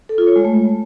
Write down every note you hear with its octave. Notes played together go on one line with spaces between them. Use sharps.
A4
F4
C#5
G#3
A3